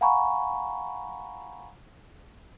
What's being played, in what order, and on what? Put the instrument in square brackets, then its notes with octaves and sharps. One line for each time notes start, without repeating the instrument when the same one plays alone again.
[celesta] F5 F#5 G#5 A#5 B5 C#6